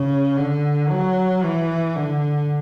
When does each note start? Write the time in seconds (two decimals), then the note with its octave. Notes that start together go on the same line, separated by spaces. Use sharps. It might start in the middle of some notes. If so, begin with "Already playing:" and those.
Already playing: C#3
0.37 D3
0.90 F#3
1.43 E3
1.95 D3